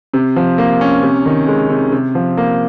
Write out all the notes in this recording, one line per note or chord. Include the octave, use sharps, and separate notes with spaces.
C3
F3
A#3
C#4
C3
D#3
G#3
C3
C3
F3
A#3